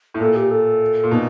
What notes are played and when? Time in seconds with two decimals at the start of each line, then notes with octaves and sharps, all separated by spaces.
0.14 A2
0.20 A#2 A4
0.36 G4
0.51 A4
1.04 A#2
1.11 B2 D#4